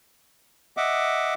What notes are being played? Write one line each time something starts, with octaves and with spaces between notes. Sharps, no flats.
D#5 E5 F#5 D6